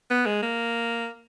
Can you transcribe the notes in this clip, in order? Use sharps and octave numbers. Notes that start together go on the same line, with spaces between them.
B3
G#3
A#3